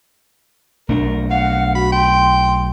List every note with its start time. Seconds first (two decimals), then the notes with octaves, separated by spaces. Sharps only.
0.89 B1 A3 D4 A#4
1.31 F5 F#5
1.75 F#4 B5
1.92 G5 C6